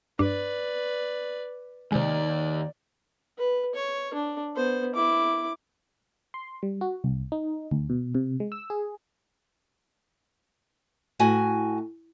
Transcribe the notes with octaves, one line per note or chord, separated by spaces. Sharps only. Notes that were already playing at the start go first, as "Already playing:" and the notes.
G2 D4 B4 D5
D#2 C3 G#3 D5
B4
C#5
D4
B3 C5
E4 D6
C6
G3
F#4
C2
D#4
D2
B2
C3
G#3
E6
G#4
A2 F#4 G#5